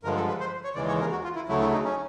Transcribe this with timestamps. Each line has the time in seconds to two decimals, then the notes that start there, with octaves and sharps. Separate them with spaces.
0.03 G2 D3 F3 G#3 A#4
0.16 A4
0.28 B4
0.40 C5
0.64 C#5
0.75 D#2 C#3 E3 G#3 D5
0.88 C#5
1.01 A#4
1.11 F#4
1.24 F4
1.36 E4
1.47 D2 C#3 F#3 A3 E4
1.61 E4
1.72 D#4
1.84 C#4